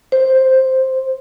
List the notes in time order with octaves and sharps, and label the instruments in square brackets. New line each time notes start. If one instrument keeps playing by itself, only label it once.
[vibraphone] C5